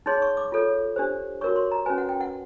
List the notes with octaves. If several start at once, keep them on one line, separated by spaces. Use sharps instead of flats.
D#4 G#4 C#5 C6
C#6
D6
F4 A4 C#5
D4 G4 C5
F#4 A#4 C#5 C#6
C6
A#5
C#4 F#4 B4 G#5
F#5
G5
F#5